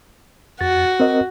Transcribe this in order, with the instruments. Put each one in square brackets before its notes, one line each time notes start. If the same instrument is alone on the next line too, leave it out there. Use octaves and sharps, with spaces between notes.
[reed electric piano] F2 A6 [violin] F#4
[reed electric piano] C4 A#4 D#5